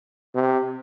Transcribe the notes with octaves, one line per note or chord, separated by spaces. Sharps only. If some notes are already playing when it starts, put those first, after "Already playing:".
C3